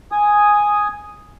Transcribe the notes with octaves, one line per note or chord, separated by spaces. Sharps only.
G#5 D#6